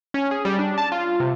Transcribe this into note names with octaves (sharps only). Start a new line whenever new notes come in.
C#4
G#4
G3
D4
A5
F4
C3